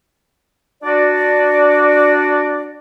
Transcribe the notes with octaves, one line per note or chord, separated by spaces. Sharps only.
D4 F#4 D5